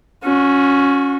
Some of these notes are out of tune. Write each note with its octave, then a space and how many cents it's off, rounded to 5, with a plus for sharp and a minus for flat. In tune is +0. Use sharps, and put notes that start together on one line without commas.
C#4 +0 F#4 -35